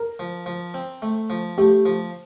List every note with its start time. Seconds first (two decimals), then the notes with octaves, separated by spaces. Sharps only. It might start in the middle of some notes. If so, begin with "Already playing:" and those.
Already playing: A#4
0.19 F3
0.46 F3
0.74 C4
1.02 A3
1.30 F3
1.58 A3 G4
1.86 F3